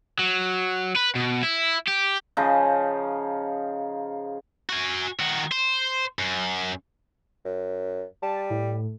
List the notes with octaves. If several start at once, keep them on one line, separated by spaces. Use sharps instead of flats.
F#3
B4
B2
E4
G4
C#3 F3 D#4
F#4 G#5
D#3 F#4
C5
F#2
F#2
G3 A5
A2